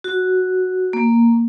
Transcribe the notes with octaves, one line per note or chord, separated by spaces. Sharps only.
F#4
A#3